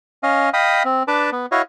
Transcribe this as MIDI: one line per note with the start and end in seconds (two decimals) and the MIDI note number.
0.23 0.50 61
0.23 0.50 75
0.23 0.50 77
0.53 0.83 75
0.53 0.83 77
0.53 0.83 79
0.53 0.83 83
0.53 0.83 87
0.85 1.03 60
1.08 1.30 62
1.08 1.30 71
1.08 1.30 81
1.08 1.30 86
1.32 1.46 59
1.52 1.62 64
1.52 1.62 66
1.52 1.62 73
1.52 1.62 75
1.52 1.62 77